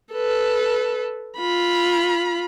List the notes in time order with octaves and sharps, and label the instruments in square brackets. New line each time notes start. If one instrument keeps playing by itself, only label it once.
[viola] A4 B4
F4 B5